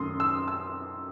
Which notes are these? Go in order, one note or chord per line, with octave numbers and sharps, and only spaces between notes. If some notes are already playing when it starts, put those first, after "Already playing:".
Already playing: F#2 D#3 A3 C6 D#6
E6
E6